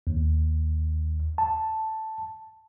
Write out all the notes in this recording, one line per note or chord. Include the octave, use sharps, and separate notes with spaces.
D#2
A5